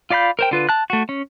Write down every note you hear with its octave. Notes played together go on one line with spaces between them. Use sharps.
F4 D5 F5 B5 G6
A#4 C5 G5
D3 F4 B4
A5 F#6
A3 F#4
C#4